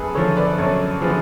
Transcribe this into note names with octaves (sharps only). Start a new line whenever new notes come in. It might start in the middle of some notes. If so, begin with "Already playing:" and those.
Already playing: F#2 G#4 A4 B4
D3 F3 A4 C#5
B4 D5
F#2 A4 C#5
D3 F3 G#4 B4